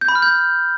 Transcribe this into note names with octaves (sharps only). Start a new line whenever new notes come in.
G6
B5
F6
G6